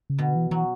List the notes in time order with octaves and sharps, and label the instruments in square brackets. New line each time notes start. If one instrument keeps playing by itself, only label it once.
[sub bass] C#3
[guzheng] B2 [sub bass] D3
[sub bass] E3
[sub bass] E3 [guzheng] F#3